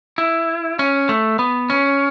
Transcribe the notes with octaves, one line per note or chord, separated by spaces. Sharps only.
E4
C#4
A3
B3
C#4